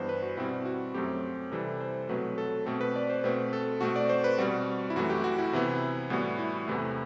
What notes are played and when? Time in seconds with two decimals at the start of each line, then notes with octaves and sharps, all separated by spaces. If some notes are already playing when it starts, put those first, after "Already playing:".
Already playing: G2 E3 B3 C5
0.09 B4
0.22 F#4
0.37 B2 G3 C4 E4
0.65 F#4
0.94 F#2 F#3 A3 C4 G4
1.52 C3 E3 G3 A4
1.81 C5
2.09 B2 F#3 A3 C4 B4
2.38 A4
2.66 B2 A3 C4 A4
2.81 B4
2.96 D5
3.10 C5
3.24 B2 A3 C4 B4
3.53 A4
3.81 B2 A3 C4 F#4
3.96 D5
4.10 C5
4.24 B4
4.38 B2 G3 C4 F#4
4.90 E4
4.96 F#2 E3 A3 F#4
5.10 G4
5.24 F#4
5.39 E4
5.53 C3 E3 B3
6.10 A2 E3 G3 B3 F#4
6.39 E4
6.68 E2 C3 E3 A3